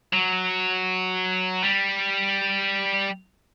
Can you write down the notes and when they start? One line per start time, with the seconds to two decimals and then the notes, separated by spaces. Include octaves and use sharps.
0.13 F#3
1.63 G3